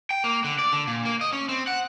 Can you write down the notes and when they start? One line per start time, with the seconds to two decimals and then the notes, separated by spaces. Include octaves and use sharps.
0.11 G5
0.24 A#3
0.44 D3
0.59 D5
0.73 D3
0.87 A#2
1.05 A#3
1.21 D#5
1.33 C#4
1.49 C4
1.67 F#5